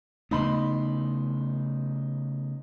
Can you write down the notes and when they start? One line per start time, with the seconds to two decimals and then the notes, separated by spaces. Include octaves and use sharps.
0.31 C#3 A3 B3 D#4 B5 C6